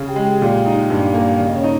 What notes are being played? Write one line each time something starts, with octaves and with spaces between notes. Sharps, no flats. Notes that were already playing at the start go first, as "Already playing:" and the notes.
Already playing: C#3
G4 G5
G#3
G4 G5
A#2
D#4
G2
A#3
C#3
D#5
C#4 C#5
D#4